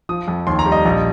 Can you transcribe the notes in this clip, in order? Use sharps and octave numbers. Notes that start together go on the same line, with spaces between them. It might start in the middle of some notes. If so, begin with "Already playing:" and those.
F3 D#6
F2
D#2 C6
A#5
G3
D#5
A#1